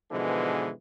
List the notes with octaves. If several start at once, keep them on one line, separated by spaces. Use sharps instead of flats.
G#2 B2 D3 E3 F3 G#3